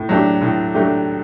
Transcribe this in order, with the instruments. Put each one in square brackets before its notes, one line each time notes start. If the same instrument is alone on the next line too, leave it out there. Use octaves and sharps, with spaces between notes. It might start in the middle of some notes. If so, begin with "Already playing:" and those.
Already playing: [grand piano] A2
F#3 A3 D4 G4
A2
F#3 A3 D4 G4